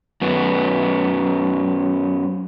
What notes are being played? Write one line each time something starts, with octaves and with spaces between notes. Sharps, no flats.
F#2 B3